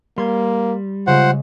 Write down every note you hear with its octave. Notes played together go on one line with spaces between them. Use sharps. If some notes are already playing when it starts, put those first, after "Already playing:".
G3 A#3 C6 G#6
C#3 G#3 F4 C5 F#5